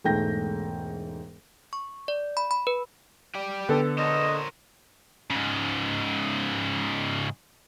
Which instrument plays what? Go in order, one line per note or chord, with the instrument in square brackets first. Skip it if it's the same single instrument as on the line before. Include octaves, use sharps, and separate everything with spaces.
[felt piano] E1 G#2 A3 G5 G6 A#6
[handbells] C#6
D5
B5
B5
B4
[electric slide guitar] G4 D5
[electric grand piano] D3 [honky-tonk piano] B3 A4
[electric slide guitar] A#4 C5 C#5 [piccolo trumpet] D#5
[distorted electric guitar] G#2 C#3